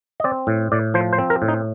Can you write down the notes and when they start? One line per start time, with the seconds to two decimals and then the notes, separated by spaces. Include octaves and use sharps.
0.20 D#5
0.24 C4 D5
0.47 A2
0.72 A2 D5
0.94 F3 C5
1.13 C5
1.18 C4
1.30 A#4
1.42 A2
1.48 D#4